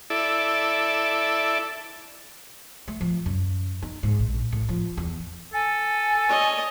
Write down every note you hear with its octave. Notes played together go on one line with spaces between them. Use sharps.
E4 A4 D5
A3
F3
F#2
D#4
G#2
A#1
A2
F3
E2
A4 G#5
C#5 D#5